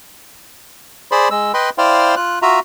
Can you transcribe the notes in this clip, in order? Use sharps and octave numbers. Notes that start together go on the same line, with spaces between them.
G#4 C5 D5 B5 C6
G#3 E6
B4 D#5 G5 B5 C6
E4 C5 D5 F5 G5 C6
F4 F#6
F4 F#4 E5 A#5